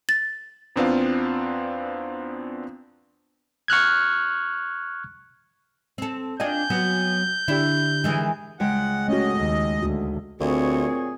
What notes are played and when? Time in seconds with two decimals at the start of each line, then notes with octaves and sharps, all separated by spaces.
0.09 A6
0.76 E2 B3 C4 D4 F4 F5
3.68 C#6 F6 F#6 G#6
5.98 C4 A4
6.40 D4 F4 D#5 G5 G#5 G6
6.70 F#3 B3 F#4
7.48 D3 D4 E4 G4
8.04 D#3 E3 G#3
8.60 C#2 G#3 F#5 G5
9.08 A3 C#4 F#4 D#5
9.37 D#2
9.83 D2 F#4
10.40 D2 A#2 C4 G#4 C#5